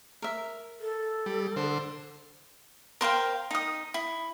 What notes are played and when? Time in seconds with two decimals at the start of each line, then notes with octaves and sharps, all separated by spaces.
0.22 A#4 E5
0.81 A4
1.26 G3
1.56 D3 C5
3.01 A#4 C5 F5 G5
3.51 D#4 D#6
3.94 E4